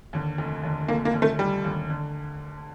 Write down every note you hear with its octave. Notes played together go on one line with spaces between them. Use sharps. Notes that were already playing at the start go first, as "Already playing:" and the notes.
D#2 D3
F1
D#2 D3
F1 A#3
A#3
D#2 D3
A3
F1 G3
D#2 D3
D3